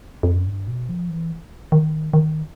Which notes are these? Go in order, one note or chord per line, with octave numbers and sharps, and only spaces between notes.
F2
F#2
G2
B2
F3
E3
D#3
D#3